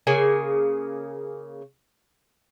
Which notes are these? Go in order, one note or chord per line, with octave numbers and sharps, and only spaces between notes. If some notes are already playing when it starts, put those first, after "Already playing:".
C#3 A#3 G#4 G#5